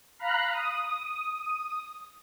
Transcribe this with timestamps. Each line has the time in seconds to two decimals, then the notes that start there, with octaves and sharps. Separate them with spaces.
0.18 F5 A#5 B5 F#6
0.52 D#6